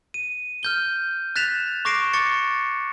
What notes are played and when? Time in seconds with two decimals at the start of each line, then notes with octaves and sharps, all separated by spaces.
0.14 D#7
0.63 F6 G6 G7
1.36 F#6 A6 B6 E7 F7
1.85 C#6 D6 A#6 C7 D7 E7
2.13 C#6 D6 A6 C#7